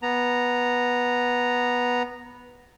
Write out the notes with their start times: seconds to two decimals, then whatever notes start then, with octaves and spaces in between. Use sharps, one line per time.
0.02 B3 A#5